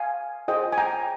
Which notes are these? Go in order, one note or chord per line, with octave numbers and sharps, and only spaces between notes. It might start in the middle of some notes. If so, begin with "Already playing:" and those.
Already playing: F5 G#5
F4 G#4 C5 D#5 G5
G#5
G5 A#5